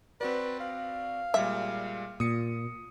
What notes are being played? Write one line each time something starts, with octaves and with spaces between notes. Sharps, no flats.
C4 F#4 B4 D5
F5
A#2 G3 G#3 E5
A#2 D#6 C#7